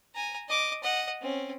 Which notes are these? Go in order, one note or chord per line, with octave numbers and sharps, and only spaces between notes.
G#5 A#5
D#5 D6
D#5 F#5
C4 C#4